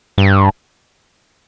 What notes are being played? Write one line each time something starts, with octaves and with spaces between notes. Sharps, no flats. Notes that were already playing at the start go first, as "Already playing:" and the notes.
G2